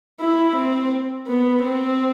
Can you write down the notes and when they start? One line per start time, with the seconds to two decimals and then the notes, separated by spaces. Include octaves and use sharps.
0.20 E4
0.56 C4
1.28 B3
1.63 C4